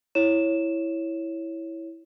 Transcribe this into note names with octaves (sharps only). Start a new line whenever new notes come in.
E4 C#5 E7